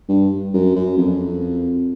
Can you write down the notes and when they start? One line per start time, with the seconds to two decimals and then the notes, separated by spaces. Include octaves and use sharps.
0.09 G2
0.54 F#2
0.76 F#2
0.98 F2